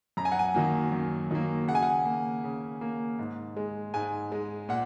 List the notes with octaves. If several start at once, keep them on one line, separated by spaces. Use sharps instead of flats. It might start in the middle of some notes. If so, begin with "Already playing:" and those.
F#2 A#5
G#5
F#5
G#5
D#3 F#3 A#3
F#2
D#3 F#3 A#3
C#3 F#5
G#5
F#5
A#3
C#3
A#3
G#2
G#3
G#2 G#5
G#3
A#2 F#5